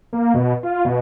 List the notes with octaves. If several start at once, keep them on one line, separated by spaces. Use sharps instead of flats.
A#3
B2
F4
B2